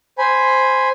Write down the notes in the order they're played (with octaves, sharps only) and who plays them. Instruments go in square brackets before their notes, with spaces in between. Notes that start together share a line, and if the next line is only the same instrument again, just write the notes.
[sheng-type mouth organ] C5 G#5 B5